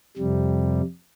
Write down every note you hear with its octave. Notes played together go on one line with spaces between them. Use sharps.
F2 C3 G3